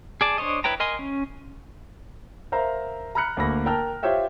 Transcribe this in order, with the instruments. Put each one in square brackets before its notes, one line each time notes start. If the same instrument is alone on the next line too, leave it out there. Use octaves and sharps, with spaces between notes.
[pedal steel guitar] G#4 D5 A5
D4 C5 C#5 D#5
E4 B4 C#5 G5 A#5
A#4 D#5 G#5 C6
C#4
[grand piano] A#4 C5 E5 F5 A#5
A#5 B5 F6 F#6 C#7
D2 A#3 B5 A#6
A#4 G5 A5 F6
F4 G4 C5 C#5 E5 G5